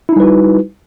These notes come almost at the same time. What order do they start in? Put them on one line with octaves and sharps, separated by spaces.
E4 D#4 G3 B4 F#4